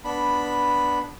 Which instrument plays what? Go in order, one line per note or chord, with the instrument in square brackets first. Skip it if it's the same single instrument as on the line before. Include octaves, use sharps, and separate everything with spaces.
[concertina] B3 D4 B5